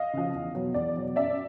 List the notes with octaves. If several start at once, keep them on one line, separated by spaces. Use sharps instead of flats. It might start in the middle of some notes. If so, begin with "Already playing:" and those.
Already playing: D#5 F5
C#3 F3
E2
B2 F#3
E2 D5
B2 F#3
F#2 D5 E5